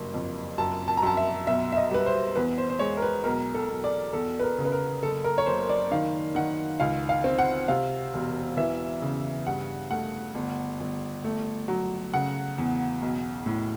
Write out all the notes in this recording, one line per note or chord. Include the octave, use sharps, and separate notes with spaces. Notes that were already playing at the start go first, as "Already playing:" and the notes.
Already playing: F#1 G2
F2
F#2 A5
A5
A#5
F#2 A5
E5
B1 E5
E5
D#5
G3 B4
C5
E2 B4
C5
C5
G#3 C#5
A#4
B4
B1 A#4
A4
B1
D5
E2 A4
B4
A#4
C#3
B4
A#4
F#1 A4
A#4
C#5
F#1 C5
D5
D#3 F5
D#3 F#5
C#2 F5
F5
C4
F#5
C3 F5
E1
E3 E5
C#3
G2 F#5
A3 F#5
G1
G1
A3
F#3
C#3 F#5
E2
B1
A2